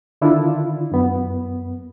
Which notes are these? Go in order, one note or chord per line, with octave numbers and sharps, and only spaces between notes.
D3 D#3 D4 E4 F4
F#2 B3